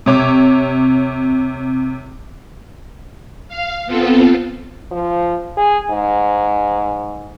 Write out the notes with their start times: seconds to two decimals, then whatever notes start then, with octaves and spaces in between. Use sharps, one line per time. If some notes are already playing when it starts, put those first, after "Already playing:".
0.06 C3 C#5 D6
3.49 F5
3.86 B3 C4 F4 A4
4.91 F3
5.57 G#4
5.90 G#2